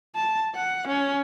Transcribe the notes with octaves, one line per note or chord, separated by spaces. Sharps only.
A5
F#5
C#4